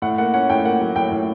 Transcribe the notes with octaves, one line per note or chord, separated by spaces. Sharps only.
A2 F#5
A#3 F#5
C#4 F#5
A2 G5
A#3 F#5
F#3
A2 G5
A2